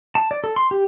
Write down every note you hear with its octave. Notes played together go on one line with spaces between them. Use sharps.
A5
D5
A4
C6
G4